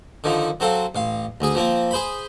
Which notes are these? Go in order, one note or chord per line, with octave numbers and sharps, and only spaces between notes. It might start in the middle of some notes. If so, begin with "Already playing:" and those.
D3 D#3 F3
F#3 C4 A4 F5
A1 F5
D2 G#4
F3 A#3 C4
G#4 C5 B5